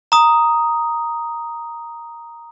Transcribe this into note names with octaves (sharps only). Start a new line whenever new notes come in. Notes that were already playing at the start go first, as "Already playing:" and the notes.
A#5 D#6